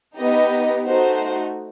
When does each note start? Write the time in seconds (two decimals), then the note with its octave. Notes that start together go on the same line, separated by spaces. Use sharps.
0.19 B3 D#4 G4 D#5
0.86 A3 D#4 F#4 C5